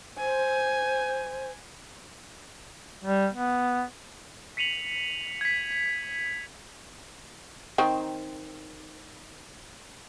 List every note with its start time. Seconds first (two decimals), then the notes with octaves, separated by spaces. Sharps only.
0.18 C5 G#5
3.04 G3
3.33 B3
4.57 B6 C#7 D#7 F7 F#7
5.41 G#6 B6
7.78 D#3 C4